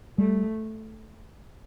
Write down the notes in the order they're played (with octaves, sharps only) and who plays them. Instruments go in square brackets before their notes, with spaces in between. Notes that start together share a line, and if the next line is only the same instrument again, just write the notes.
[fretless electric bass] G3 [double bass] A3